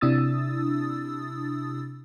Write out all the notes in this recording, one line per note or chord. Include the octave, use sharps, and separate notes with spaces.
C3 D4 E4 D#6 E6 A6